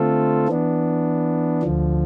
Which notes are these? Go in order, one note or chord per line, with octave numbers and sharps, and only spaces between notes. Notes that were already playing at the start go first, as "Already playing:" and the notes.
Already playing: D3 A3 C4 F4 A4
E3 B3 D4
D2 D3 F3